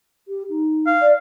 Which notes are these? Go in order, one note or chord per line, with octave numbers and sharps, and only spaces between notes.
G4
D#4
F5
D5